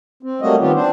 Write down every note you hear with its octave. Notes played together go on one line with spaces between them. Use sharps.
C4
F#3 G3 A3 A#3 F#4 D#5
D#3 B3 C4 F4 G4
C4 D4 C5